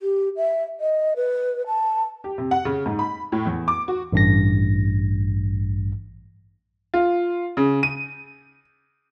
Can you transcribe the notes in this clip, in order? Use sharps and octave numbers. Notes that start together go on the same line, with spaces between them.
G4
E5
D#5
B4
A5
G4
C3
F#5
C#3
G#2
B5
A2
E2
D6
F#4
A1 G2 A#6
F4
C#3
D#7